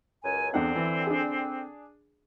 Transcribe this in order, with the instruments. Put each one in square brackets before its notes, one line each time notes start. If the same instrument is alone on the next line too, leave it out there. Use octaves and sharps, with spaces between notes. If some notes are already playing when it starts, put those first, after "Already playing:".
[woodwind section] C#2 F#2 G#5
[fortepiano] E2 D4 F#5 [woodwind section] D3 C4
[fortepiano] E3
D4 G#4